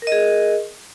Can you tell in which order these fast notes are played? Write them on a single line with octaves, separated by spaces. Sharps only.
A#4 D#5 G#4